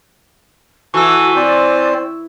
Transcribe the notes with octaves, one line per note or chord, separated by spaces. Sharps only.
E3 F#4 A4 C#6 E6
C4 C5 D5